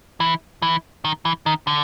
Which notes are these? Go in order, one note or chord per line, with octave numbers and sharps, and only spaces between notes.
E3
E3
D#3
E3
D#3
D3